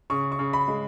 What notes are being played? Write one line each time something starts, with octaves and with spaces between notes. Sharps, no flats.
C#3 C#6
C#6
C#3
B5
G#3